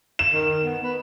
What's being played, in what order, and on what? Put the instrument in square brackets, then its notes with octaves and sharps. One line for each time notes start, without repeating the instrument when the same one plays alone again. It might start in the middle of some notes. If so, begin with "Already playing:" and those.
[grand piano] E7
[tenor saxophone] D#3
B3
B4